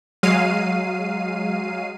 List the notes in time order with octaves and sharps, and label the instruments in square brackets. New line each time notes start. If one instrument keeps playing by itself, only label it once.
[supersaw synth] F#3 G#3 F5 C7 D#7